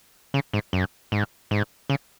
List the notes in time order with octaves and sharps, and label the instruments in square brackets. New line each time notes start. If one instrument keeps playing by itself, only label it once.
[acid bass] C#3
G#2
F#2
G#2
G#2
C#3